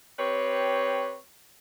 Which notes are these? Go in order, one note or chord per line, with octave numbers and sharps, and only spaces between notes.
C4 G4 B4 C#5